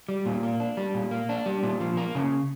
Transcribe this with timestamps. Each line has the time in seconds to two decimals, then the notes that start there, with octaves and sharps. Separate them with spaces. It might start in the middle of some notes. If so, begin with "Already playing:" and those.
0.09 G3
0.26 A#2
0.43 A#3
0.60 D4
0.77 G3
0.95 A#2
1.11 A#3
1.29 D4
1.46 G3
1.63 A#2
1.80 F3
1.97 A#3
2.15 C#3